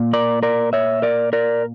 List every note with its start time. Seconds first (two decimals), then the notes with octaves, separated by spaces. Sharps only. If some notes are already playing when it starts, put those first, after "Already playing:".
Already playing: A#2
0.13 A#4 D5
0.43 A#4 D5
0.73 C#5 E5
1.02 A#4 D5
1.33 A#4 D5